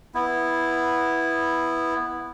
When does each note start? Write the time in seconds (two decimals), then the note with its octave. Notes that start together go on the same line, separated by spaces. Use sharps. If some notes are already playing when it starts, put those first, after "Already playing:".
0.15 B3 E4